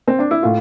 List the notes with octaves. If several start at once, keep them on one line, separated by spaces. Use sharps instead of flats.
C4
D4
E4
A2 F4